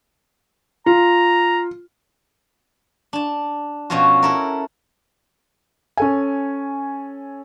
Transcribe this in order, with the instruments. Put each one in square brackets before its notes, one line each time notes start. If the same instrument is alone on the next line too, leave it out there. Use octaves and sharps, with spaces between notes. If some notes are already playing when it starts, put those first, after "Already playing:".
[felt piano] F4 [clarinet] A#5
[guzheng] D4 A5
B2 F3 C#4 F4 F#4
E4 A4 A#4
[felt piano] C#4 A4 G#5